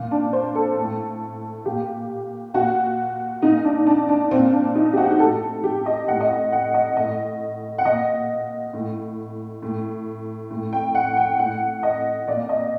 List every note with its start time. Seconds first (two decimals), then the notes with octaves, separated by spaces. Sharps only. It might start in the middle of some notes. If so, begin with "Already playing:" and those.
Already playing: A#2
0.11 D4
0.33 C5
0.55 A4
0.77 A2
1.65 A#2 G4
2.54 A#2 F#4
3.42 A#2 D#4
3.65 D4
3.87 D4
4.09 D4
4.31 A#2 C4
4.53 D4
4.75 D#4
4.93 G4
4.97 F#4
5.10 G4
5.19 A2 A4
5.64 G4
5.86 D#5
6.07 A2 F#5
6.20 D#5
6.30 F#5
6.52 F#5
6.74 D#5
6.96 A2 D#5
7.78 F#5
7.85 A#2 D#5
8.73 A2
9.62 A2
10.51 A2
10.73 G5
10.95 F#5
11.17 G5
11.39 A2 F#5
11.83 D#5
12.27 A#2 D5
12.49 D#5